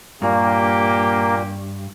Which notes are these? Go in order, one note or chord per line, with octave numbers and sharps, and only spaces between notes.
G2 A#2 A#3 G4